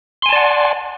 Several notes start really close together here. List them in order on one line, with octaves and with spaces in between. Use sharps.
C6 G#5 A5 D5 F#5